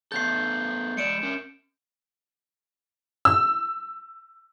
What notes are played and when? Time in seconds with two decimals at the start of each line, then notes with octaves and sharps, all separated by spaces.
0.12 A3 B3 A4 G6 C7
0.97 G#3 D5 C#7 D7 E7
1.23 C#4 A#4
3.25 E6